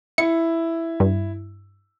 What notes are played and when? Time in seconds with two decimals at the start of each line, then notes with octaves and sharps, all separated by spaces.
0.18 E4 C#7
1.00 G2